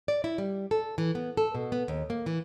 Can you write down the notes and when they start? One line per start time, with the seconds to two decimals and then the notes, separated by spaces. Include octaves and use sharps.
0.08 D5
0.24 E4
0.38 G3
0.71 A4
0.98 E3
1.15 B3
1.37 A4
1.55 B2
1.72 B3
1.88 D#2
2.10 A#3
2.26 E3